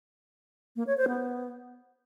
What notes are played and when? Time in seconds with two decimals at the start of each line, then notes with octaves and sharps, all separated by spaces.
0.76 A#3
0.87 C#5
0.97 C5
1.08 B3